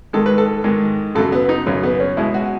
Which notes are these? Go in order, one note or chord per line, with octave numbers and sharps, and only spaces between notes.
G#2 D#3 G#3 A4
B4
A4
G#2 D#3 G#3
F#2 C#3 F#3 A4
B3
D#4
F#2 C#3 F#3 C#4
B3
C#4
B2 G#3 E4
F#4